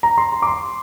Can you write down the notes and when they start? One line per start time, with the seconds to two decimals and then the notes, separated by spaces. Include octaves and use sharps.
0.03 A#5
0.18 C6
0.32 A#5
0.42 D6
0.47 C6